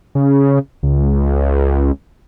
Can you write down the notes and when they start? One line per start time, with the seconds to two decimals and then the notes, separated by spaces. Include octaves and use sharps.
0.15 C#3
0.83 C#2